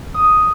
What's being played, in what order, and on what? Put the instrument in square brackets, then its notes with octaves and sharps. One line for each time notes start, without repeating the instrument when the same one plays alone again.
[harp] D#6